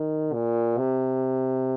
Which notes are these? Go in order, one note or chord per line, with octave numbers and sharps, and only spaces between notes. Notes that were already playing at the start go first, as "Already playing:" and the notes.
Already playing: D#3
A#2
C3